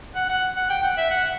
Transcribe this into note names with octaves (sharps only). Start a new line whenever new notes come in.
F#5
F#5
F#5
G5
F#5
E5
F#5